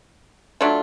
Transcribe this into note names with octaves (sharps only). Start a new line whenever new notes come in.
F#3 A3 D4 F4